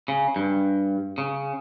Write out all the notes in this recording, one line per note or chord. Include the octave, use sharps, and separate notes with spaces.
C#3
G2
C#3